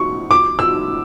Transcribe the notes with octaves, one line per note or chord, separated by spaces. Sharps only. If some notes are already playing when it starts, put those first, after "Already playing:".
Already playing: C#6
D6
E6